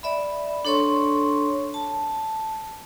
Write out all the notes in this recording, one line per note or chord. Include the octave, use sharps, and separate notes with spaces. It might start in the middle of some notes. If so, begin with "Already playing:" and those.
D5 E5 B5
D4 A4 C#5 C6 C#6
A5